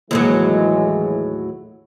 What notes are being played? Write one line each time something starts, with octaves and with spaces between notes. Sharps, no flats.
D#2 A2 E3 F#3 G#3